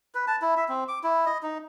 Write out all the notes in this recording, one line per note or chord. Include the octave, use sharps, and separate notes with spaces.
B4
A5
E4
E5
C4
D6
E4
D#5
D#4